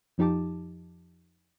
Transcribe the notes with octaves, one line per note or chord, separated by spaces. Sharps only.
F2 F3 D#4 G4 A5 D6